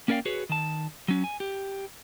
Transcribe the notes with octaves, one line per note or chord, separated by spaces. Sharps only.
A#3 C#4 A#4 D5 F5 G5
F#4 G#4 B4 C#5
D#3 A5
F#3 C#4
G#5
G4